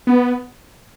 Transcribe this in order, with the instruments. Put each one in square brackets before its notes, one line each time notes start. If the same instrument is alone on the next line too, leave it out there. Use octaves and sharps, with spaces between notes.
[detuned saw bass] B3